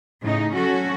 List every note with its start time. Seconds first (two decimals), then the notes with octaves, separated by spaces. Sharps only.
0.23 A2 C#3 D#4
0.55 F#3 C#4 F#4 A4